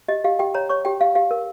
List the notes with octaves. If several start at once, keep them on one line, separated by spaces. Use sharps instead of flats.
G4 D#5
G4 F5
G4 G5
C#5 A#5
C#5 C#6
G4 G5
G4 F5
G4 F5
A#4